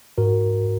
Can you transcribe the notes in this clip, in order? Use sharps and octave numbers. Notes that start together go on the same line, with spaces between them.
G#2 F#4 A#4